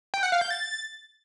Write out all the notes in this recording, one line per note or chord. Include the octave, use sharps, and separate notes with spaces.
G5
F#5
F5
G6
A6